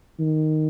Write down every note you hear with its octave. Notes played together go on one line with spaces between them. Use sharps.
D#3